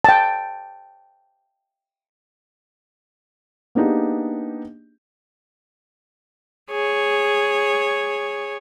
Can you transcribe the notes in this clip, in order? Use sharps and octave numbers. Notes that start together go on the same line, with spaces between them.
G5 A5
A#3 B3 D4 D#4 G4 G#4
G#4 C#5